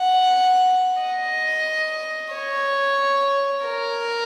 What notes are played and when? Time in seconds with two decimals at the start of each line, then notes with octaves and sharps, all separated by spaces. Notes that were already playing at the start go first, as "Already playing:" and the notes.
Already playing: F#5
1.02 D#5
2.34 C#5
3.66 A#4